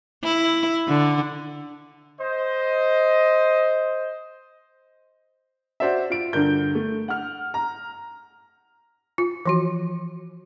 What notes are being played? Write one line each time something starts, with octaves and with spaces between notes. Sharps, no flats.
E4
D3
C5 D#5
F#4 C5 D5 E5
F4 D7
G2 D3 A#4 G6
A3
F#5 F6
A#5
F4
E3 F3 F#4